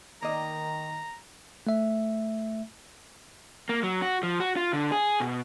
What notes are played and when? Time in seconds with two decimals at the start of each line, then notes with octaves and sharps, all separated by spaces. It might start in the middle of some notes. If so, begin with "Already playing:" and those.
0.22 D#3 A#3 D#5 A#5
1.67 A3 E5
3.69 A#3
3.83 F#3
4.02 F#4
4.23 F3
4.40 F#4
4.57 F4
4.73 D3
4.92 G#4
5.20 B2